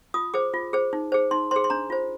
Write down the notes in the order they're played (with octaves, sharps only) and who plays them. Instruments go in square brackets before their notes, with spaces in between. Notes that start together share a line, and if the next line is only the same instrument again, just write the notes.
[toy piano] F4 D#6
G#4 C5 D6
F4
G#4 C5
D#4
G#4 C5
D#4 C6
G#4 C5 C6
C6
D4 A#5
F4 C5